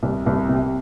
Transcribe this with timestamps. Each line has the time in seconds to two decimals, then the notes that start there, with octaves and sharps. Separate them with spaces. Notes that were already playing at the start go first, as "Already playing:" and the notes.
0.03 C2
0.26 C2
0.49 C3